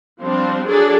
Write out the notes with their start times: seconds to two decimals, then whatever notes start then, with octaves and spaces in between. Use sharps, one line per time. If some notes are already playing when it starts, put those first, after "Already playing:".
0.20 F3 G3 C4 D4 C5
0.67 F#3 D4 G#4 A4 D5